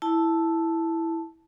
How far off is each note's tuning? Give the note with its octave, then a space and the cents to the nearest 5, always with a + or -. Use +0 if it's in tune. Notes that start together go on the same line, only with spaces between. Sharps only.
E4 +0 A5 +0